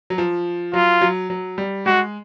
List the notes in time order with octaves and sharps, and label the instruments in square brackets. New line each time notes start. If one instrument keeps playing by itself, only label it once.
[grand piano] F#3
F3
[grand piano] F#3 [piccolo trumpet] F4
[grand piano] F#3
F#3
G3
[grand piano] G#3 [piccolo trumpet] F#4